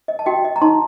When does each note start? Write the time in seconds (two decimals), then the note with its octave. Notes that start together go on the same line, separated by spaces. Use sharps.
0.08 D#5
0.19 A5
0.26 F#4 D#5 G5
0.45 D#5
0.56 A#5
0.62 D#4 A5 C6